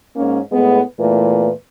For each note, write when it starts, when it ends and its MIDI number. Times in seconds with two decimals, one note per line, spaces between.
0.16 0.40 44
0.16 0.40 58
0.16 0.40 61
0.52 0.82 45
0.52 0.82 56
0.52 0.82 59
1.00 1.50 40
1.00 1.50 46
1.00 1.50 52
1.00 1.50 57
1.00 1.50 71